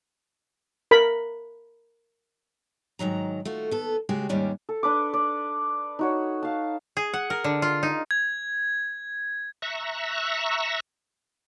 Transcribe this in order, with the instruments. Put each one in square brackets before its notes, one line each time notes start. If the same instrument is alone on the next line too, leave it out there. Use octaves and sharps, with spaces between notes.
[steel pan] A#4 B5
[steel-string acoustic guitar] G#2 D#3 F#3 A#5
A3 F4 F#4
B3 A4
C#3 G#3 F#4 G4
D#2 G#2 G3 C#4 D4
[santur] A4
D4 B4 D6
D5
D#4 F#4 C#5
F5 A5
[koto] G#4
F#5
A#4
D3
F4
D#4
[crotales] G#6
[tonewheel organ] E5 A#5 C#6 E6 F#6